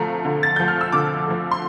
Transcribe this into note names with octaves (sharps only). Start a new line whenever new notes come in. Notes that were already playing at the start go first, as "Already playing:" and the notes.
Already playing: D3 F3 A3 A#5
D3
A6
F3 A3 G6
F6
E6
D3 D6
F3 A3
C6